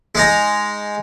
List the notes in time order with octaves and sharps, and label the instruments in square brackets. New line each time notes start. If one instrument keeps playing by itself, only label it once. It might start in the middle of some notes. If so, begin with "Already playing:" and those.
[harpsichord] G#3 D#4 A#5